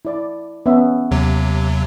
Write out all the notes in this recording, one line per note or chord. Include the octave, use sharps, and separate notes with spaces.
E4 D5
B3 C#4 E5
D#2 C3 F#3